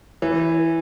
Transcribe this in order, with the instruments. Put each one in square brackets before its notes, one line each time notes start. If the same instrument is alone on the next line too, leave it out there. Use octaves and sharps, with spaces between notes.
[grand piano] E3